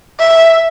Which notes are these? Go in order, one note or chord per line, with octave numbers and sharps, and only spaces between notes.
E5